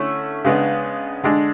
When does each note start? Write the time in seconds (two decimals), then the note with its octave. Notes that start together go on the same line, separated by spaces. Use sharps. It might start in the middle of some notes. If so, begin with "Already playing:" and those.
Already playing: D3 A3 C#4 E4
0.44 C#3 G#3 B3 D4
1.23 D3 G#3 D4